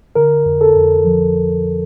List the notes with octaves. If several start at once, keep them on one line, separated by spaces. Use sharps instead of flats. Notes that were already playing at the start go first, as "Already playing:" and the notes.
D3 A#4
F2
A4
F2
F3